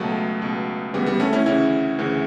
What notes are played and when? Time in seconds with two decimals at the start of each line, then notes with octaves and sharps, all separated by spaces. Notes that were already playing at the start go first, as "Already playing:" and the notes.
Already playing: C#2 B2 F#3 A3
0.41 C#2 B2
0.93 D2 C#3 E3 G3 B3
1.06 G3 B3
1.20 A3 C#4
1.33 C#4 E4
1.46 D2 C#3 E3 C#4 E4
1.99 D2 C#3 E3